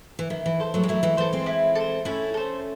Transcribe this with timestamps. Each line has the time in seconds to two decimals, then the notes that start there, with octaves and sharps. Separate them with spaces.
0.19 E3
0.30 D#3 E4
0.46 E3
0.60 A4 C5
0.74 F#3 A3
0.84 G#3
0.88 F#3 A3 E4
1.03 E3 G#3
1.17 E3 A4 C5
1.33 G#3 C4
1.46 E4
1.75 A4 C5
2.05 A3 C#4 E4
2.34 A4 C5